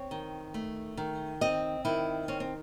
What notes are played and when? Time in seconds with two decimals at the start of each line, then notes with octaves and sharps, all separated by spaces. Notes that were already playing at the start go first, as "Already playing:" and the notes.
Already playing: C4 C#5
0.11 D#3
0.54 A3
0.97 D#3
1.41 C4 D#5
1.85 D#3 E4
2.28 C4 C#4
2.40 C4